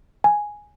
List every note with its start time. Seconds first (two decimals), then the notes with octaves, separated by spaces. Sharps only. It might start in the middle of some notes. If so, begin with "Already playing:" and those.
0.24 G#5